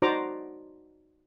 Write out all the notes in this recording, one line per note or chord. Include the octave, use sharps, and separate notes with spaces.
D#4 F#4 C5 D5 A#5 D6